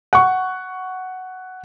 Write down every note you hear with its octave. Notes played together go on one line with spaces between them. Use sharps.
F#5 C#6